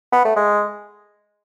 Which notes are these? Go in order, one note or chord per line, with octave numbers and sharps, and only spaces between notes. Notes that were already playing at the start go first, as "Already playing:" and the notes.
B3
A3
G#3